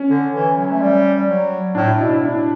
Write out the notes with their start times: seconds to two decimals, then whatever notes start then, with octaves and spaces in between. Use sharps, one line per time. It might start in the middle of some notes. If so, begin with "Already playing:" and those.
Already playing: C#4
0.10 D3
0.34 E3
0.57 F#3
0.71 A3
0.81 G3
1.28 F#3
1.75 A2 D4
1.87 E4
1.99 B2 D4
2.13 E4
2.25 D4